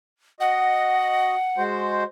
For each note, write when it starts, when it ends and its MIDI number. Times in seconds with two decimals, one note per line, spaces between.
0.40 1.35 66
0.40 1.35 75
0.40 1.63 78
1.58 2.04 56
1.58 2.04 66
1.58 2.04 72